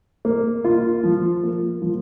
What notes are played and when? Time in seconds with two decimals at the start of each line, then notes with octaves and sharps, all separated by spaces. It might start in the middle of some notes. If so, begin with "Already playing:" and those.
0.25 A#3
0.64 F4
1.03 F3
1.43 A#3
1.82 F3